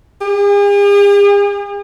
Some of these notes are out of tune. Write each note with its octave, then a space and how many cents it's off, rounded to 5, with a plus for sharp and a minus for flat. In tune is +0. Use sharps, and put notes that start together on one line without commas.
G#4 -45